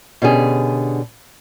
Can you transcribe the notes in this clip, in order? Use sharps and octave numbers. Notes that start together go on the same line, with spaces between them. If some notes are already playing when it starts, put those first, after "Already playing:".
B2 D3 C#4 D4 G4 G#4